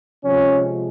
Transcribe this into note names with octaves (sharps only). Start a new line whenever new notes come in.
C3 F3 G#3 C#4